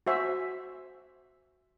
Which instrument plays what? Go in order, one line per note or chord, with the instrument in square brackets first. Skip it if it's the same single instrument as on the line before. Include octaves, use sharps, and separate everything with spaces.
[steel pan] F#4 C5 E5 G#5